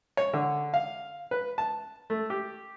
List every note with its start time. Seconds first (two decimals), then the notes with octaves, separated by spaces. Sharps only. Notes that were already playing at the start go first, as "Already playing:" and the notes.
0.17 C#5
0.33 D3
0.74 F5
1.31 B4
1.58 A5
2.10 A3
2.30 G4